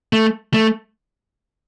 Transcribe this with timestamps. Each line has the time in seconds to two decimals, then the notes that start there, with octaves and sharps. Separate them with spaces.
0.13 A3
0.54 A3